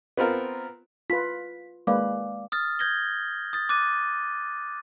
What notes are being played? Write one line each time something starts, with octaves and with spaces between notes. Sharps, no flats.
B3 C4 F4 A#4
F4 B4 B6
G#3 A#3 B4 D5 F5 D6
D#6 F6 A6
G6 G#6 A#6 G7
D#6 A6
D6 F#6 A6 D#7